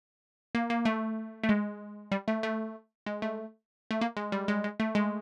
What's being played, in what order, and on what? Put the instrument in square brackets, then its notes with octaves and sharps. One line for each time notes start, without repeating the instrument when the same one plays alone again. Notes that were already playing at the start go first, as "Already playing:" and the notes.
[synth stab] A#3
A#3
A3
A3
G#3
G3
A3
A3
G#3
A3
A3
A#3
G#3
G3
G#3
G#3
A3
G#3